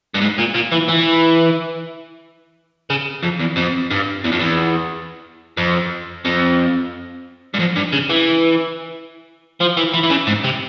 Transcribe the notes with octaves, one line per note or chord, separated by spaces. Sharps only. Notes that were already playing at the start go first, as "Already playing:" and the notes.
G2
G#2
A#2
A#2
E3
E3
C#3
F2
E2
F2
G2
E2
F2
E2
F2
F2
G2
F2
G2
C#3
E3
F3
E3
E3
E3
C#3
G#2
C3